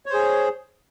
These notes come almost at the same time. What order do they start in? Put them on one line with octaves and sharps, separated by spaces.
C#5 C5 G#4